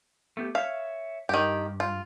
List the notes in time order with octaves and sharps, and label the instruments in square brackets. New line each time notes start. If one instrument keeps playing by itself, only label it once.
[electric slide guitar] A3 B3 G4
[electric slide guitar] C#5 E5 [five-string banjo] F5
[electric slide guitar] G2 [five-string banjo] D#3 G4
[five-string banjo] F4